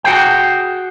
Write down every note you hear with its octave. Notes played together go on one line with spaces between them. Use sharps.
F#4 G#4 G5